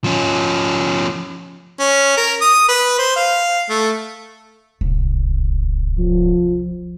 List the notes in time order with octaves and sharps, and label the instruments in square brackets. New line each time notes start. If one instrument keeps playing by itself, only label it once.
[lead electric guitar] F3 C#4
[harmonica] C#4
A#4
D#6
B4
C5
F5
A3
[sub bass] D1 [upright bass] C2
[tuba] F3